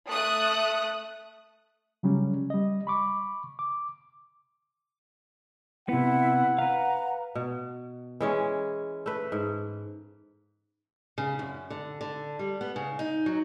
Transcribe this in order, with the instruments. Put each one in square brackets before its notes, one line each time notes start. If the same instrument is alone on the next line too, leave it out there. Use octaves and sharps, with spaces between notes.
[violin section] A3 D#6 F#6
[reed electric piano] C#3 F#3 G3 C#4
G3 D#5
B5 C#6 D6
D6
[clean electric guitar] C3 B3 [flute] E4 [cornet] F#5
[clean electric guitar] B4 F5 [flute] A#5
[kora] B2
E3 G#3 C#4
A3 B4
G#2
[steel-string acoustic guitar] C#3
F#2
D3
D3
G3
B3
C#3
D#4
F#3